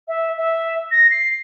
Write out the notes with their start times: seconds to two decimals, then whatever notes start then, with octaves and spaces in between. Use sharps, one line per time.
0.08 E5
0.37 E5
0.91 A#6
1.10 C7